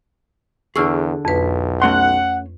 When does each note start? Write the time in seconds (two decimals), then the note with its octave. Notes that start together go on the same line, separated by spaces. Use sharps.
0.76 E2 D3 G#4 C#6 E6 F6
1.25 B1 F2 B4
1.82 A3 C#4 F#5 C6